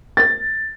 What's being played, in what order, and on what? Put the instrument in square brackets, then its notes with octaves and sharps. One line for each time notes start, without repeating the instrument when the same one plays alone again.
[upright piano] A6